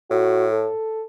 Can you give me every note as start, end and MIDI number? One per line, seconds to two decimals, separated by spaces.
0.10 0.69 45
0.10 0.46 66
0.53 1.03 69